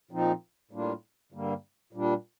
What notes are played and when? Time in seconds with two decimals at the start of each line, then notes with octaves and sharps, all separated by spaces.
0.11 A#2 F3 C4 D#4
0.71 A2 G3 A#3 D4 F4
1.32 G2 D3 G3 A#3
1.93 A#2 G3 D4